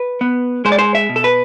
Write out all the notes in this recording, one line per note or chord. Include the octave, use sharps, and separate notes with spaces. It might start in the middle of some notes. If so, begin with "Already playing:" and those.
Already playing: B4
B3
G#3 C5
D5
C5
E5
B2
A4
B4